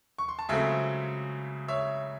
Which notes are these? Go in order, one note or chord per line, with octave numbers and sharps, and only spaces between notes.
C#6
C6
A5
C#2 C#3 F#3 A3 C4 E5 G#5
C#5 E5